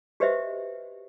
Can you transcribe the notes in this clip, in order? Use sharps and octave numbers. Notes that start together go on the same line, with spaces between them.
F#4 G4 B4 C5 D#5 E5